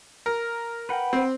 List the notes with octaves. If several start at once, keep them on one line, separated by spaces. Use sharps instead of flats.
A#4
B4 F#5 G5
C4